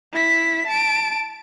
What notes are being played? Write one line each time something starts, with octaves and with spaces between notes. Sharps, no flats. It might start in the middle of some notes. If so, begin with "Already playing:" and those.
E4 B6
A5 D7